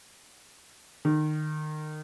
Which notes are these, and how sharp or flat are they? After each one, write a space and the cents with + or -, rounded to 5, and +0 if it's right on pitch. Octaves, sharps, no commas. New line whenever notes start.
D#3 -25